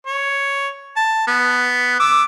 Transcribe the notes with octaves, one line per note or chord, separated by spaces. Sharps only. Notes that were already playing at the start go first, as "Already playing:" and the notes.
C#5
A5
B3
D6 E6